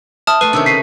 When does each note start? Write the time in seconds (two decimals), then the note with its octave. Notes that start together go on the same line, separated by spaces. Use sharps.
0.27 E5 A5 D#6 F6
0.41 A3 B4 C6 D#7
0.53 C3 D#3 C#4 D4 E6
0.66 C#3 B6 C7 D#7